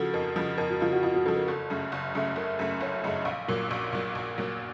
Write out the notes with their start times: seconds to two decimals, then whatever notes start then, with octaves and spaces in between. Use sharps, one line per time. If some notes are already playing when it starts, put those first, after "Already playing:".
Already playing: C#3 F3 F#4 A4
0.13 F2 A#4
0.36 C#3 F3
0.58 F2 A#4
0.70 F#4
0.81 C#3 F3 F4
0.92 F#4
1.03 F2 F4
1.14 F#4
1.25 C#3 F3 A4
1.36 A#4
1.47 F#1 A4
1.70 F#2 C#3 A3
1.92 F#1
2.15 F#2 C#3 A3
2.36 F#1 A#4
2.59 F#2 C#3 A3
2.81 F#1 C#5
3.04 F#2 C#3 A3 D#5
3.25 A#1 F5
3.48 A#2 F#3 A#3
3.71 A#1
3.92 A#2 F#3 A#3
4.15 A#1
4.38 A#2 F#3 A#3